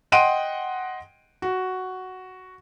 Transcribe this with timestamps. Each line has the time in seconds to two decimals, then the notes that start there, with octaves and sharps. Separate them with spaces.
0.12 D#5 F#5 G5 C6 D7 D#7
1.42 F#4